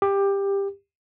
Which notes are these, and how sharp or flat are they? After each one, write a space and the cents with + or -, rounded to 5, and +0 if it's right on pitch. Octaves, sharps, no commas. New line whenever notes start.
G4 +15